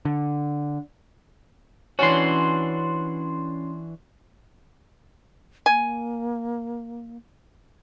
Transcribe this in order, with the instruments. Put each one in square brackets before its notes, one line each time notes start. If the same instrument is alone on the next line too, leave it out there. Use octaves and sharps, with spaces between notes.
[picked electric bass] D3
[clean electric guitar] E3 D4 F#4 [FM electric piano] C#4 C6
[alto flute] A#3 [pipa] G#5